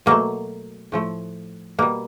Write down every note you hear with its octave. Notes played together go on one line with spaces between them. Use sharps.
B2 F#3 A3 A#3
A2 F3 A3
B2 G3 A#3